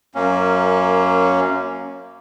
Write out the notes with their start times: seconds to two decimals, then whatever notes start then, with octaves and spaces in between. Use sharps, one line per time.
0.15 F#2 A#3 C#4